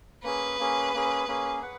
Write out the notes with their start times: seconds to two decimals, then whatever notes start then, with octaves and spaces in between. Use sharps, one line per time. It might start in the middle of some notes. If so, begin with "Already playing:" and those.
0.24 A#3 C#4 G#4 B4
0.59 A#3 C#4 G#4
0.94 A#3 C#4 G#4
1.28 A#3 C#4 G#4
1.63 B4 F#5